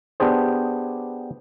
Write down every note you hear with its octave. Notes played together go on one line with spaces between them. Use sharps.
B3 D4 G4 G#4 C5